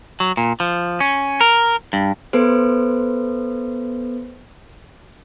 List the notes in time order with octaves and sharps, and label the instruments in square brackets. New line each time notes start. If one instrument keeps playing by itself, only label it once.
[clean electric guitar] F#3
A#2
F3
C#4
A#4
G2
[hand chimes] B3 A4 B4 C5